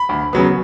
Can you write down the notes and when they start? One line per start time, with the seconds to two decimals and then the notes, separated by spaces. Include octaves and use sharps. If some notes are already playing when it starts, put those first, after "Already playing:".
Already playing: B5
0.09 D2
0.33 C#3 F#3 B3